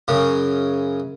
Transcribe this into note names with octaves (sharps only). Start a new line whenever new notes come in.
F#2 C#3